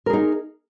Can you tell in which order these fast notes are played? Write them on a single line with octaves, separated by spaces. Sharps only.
A#4 G#4 D#4